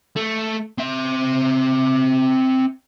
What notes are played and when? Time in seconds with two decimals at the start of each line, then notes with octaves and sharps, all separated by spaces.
0.16 A3
0.78 C4 E5